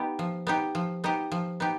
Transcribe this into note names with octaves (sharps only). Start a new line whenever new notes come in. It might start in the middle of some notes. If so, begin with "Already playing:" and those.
Already playing: B3 D#4 G4
F3
B3 D#4 G4
F3
B3 D#4 G4
F3
B3 D#4 G4